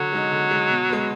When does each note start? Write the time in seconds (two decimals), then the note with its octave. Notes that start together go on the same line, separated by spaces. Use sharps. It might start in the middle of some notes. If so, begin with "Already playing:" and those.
Already playing: D3 F#3
0.13 G#3 D#4
0.32 D3
0.51 G#3 D#4
0.70 B2
0.89 G#3 B3